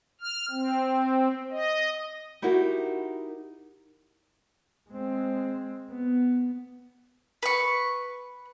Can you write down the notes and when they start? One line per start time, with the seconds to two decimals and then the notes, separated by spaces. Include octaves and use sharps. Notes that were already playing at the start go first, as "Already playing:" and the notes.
0.21 F6
0.50 C4
1.51 D#5
2.42 D#4 E4 F#4 G4 A#4
4.90 G#3 C4
5.91 B3
7.43 B4 C#6